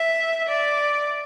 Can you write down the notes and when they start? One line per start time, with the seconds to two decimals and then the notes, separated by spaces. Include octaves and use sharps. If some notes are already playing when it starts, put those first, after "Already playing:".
Already playing: E5
0.49 D5